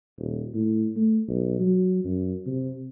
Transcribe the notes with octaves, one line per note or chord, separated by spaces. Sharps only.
D#1
A2
A3
B1
F#3
F#2
C3